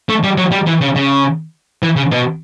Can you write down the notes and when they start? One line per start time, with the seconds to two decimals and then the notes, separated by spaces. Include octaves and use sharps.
0.09 A3
0.24 G3
0.38 F#3
0.52 G3
0.67 E3
0.81 C#3
0.96 C#3
1.83 E3
1.96 C#3
2.11 B2